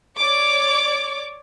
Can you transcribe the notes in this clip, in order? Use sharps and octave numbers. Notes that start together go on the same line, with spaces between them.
C#5 D5 D6